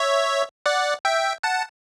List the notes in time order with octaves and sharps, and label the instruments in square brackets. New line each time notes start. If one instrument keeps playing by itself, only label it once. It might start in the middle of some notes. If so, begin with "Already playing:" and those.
Already playing: [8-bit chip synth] C#5 E5
D5 F#5
E5 G5
F#5 A5